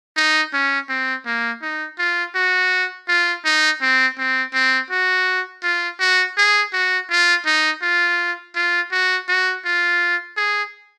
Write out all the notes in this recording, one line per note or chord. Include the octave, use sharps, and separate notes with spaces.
D#4
C#4
C4
A#3
D#4
F4
F#4
F4
D#4
C4
C4
C4
F#4
F4
F#4
G#4
F#4
F4
D#4
F4
F4
F#4
F#4
F4
G#4